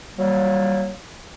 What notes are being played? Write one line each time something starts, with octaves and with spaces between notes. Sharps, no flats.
F#3 G3 A#3